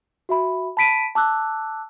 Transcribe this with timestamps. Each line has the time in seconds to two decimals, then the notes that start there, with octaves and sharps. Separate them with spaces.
0.29 F#4 E5 B5
0.77 A5 B5 B6 D7 D#7
1.15 A5 D6 E6 F#6